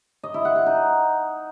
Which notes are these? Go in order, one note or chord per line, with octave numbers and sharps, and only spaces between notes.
D#5
E4
F#5
F#5
D#4